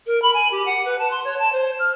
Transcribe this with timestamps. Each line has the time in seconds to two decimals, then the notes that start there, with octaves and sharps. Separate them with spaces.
0.06 A#4
0.22 B5
0.34 G#5
0.51 G4
0.66 F#5
0.85 B4
0.99 A5
1.11 C6
1.24 C#5
1.39 A5
1.53 C5
1.79 F6